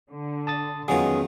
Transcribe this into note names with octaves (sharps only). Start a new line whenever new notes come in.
D3
A5 D#6 A6
F2 D#3 F#3 G#3 B3 C#4 F4 G#4